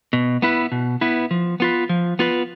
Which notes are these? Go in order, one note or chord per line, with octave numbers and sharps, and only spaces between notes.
B2
B3 E4 B4
B2
B3 E4 B4
F3
B3 F4 B4
F3
B3 F4 B4